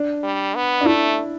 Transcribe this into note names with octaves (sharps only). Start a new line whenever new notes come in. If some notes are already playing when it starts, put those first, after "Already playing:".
Already playing: D4
G3
B3
D4
A3 E4